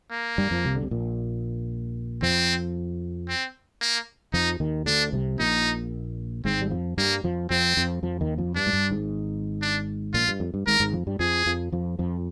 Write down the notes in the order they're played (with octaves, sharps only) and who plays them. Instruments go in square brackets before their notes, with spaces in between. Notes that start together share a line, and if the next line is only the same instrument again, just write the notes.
[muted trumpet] A#3
[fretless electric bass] G2 G3
F2 F3
C2 C3
D3
C3
A#1 A#2
[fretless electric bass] F2 F3 [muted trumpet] C4
[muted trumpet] C4
A#3
[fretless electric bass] F2 F3 [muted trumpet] D#4
[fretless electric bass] D#2 D#3
[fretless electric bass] D2 D3 [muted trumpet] D4
[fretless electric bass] C2 C3
[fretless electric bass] A#1 A#2 [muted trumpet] D#4
[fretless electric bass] G#1 G#2 [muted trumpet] C4
[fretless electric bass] G3
F2 F3
[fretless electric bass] G2 G3 [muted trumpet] A#3
[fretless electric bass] F2 F3
[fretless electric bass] F2 F3 [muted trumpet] C4
[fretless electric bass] F2 F3
F2 F3
D#2 D#3
F2 F3
[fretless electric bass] G2 [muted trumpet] D4
[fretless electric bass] G#2
G2
G#1 G#2
[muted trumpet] D4
[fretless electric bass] A#1 A#2 [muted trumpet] F4
[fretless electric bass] G2
F2
G2
[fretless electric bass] G#1 G#2 [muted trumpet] A#4
[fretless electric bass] G#1 G#2
F2 F3
G2 G3
[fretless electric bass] F2 F3 [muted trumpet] G#4
[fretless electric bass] F2 F3
F2 F3
F2 F3